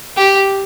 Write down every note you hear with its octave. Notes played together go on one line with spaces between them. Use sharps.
G4